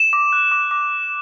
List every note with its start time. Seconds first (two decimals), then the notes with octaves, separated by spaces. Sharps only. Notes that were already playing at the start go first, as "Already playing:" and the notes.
Already playing: E7
0.13 D6
0.33 F#6
0.52 D6
0.71 D6